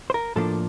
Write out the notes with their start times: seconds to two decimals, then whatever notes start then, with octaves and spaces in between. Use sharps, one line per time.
0.10 C5
0.14 A#4
0.36 A2 F3 A#3 D4 A4